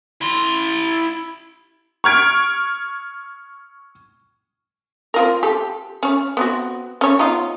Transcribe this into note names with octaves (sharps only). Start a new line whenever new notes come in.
E4 C6
C#6 F6 G#6 D7
C4 F4 A#4
G4 A4
C#4 C#5
B3 C4 F#4
C#4 C#5
B3 D#4 F4